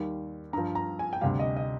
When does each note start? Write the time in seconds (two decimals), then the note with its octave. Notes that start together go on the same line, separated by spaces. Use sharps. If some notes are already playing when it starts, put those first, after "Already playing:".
Already playing: D#2 D#3 G3
0.53 G2 A#5
0.58 F3
0.75 A#5
0.99 G#5
1.13 G5
1.21 D2 C3 G3 F5
1.39 D#5
1.56 D#5